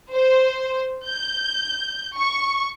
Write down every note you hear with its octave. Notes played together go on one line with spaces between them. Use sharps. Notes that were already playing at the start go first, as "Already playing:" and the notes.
C5
G6
C#6